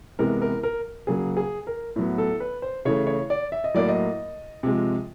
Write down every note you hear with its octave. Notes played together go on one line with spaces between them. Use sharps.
C3 E3 G#3 B3 A#4
A#4
A#4
C#3 F#3 A#3 G#4
G#4
A#4
A2 F#3 B3
A4
B4
C5
C#3 E3 A3 C#5
C#5
D5
E5
D#5
A2 F#3 A#3 D5
D#5
C3 F3 G#3